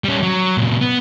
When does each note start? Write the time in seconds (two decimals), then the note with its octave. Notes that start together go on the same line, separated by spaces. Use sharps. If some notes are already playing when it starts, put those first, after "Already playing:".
0.04 G3 C#4
0.23 F#3
0.57 A#2 C#3
0.81 B3